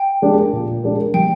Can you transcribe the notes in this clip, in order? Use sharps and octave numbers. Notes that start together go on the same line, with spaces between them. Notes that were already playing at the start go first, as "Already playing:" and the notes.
Already playing: G5
G#3 D4 G4 A#4
A#2
G#3 D4 G4 A#4
G3 G5